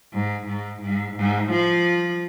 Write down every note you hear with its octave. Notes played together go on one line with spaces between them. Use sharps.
G#2
G#2
G#2
G#2
F3